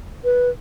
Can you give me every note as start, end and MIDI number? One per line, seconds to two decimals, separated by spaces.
0.24 0.49 71